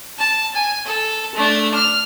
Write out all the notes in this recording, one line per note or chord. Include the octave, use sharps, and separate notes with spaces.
A5
G#5
A4
A3 D4
F6